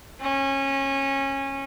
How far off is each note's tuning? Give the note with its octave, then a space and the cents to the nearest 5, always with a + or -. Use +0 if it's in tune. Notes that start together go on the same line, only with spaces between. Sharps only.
C#4 -20